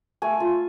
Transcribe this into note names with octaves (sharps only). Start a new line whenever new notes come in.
A3 G#5
F4